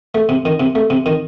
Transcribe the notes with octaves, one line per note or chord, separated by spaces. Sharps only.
A3
C3
D#3
C3
A3
C3
D#3